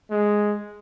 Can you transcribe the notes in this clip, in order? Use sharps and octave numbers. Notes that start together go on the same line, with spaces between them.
G#3